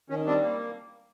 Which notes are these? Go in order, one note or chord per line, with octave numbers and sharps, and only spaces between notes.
D#3 C#4
G3 C4 D4
A#3